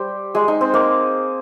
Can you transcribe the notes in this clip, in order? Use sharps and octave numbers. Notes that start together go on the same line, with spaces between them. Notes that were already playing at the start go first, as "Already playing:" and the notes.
Already playing: G3 G4 C5
G#3 G#4
D#4
C4
A#3